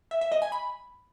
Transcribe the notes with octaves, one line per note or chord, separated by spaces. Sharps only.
E5
E5
D#5
G#5
B5